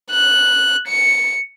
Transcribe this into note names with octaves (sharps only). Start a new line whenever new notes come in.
F#6
C#7